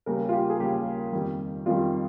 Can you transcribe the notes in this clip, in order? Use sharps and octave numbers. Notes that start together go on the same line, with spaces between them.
D#2 C#3 G3 A#4
F4
G4
G#4
D#2 C#3 G3 G4
F2 D#3 G3
F2 D#3 G3 F4